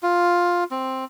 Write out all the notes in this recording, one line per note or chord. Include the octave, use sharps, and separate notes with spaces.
F4
C4